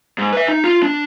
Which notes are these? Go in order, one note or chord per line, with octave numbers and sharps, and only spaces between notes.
G#2
B4 E5
D#4
F4
D4